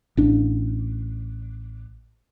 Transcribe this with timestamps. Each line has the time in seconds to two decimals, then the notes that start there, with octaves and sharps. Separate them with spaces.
0.17 A1 D4